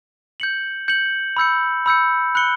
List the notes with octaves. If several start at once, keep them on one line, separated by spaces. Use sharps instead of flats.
G6 C#7 F#7
G6 C#7 F#7
B5 E6 G6 C#7
B5 E6 G6 C#7
B5 F#6 C#7 G7